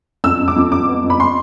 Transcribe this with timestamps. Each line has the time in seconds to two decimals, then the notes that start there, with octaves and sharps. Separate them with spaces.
0.24 F2 E6
0.40 F2
0.48 D6
0.56 F2
0.72 F2 D6
0.87 B3
1.04 F2
1.10 B5
1.20 C6